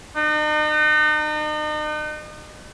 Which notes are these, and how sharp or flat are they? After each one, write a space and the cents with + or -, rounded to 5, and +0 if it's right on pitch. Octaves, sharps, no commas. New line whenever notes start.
D#4 -40